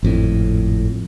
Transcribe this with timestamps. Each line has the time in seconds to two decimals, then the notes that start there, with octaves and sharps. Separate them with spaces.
0.03 G#1 F2 A2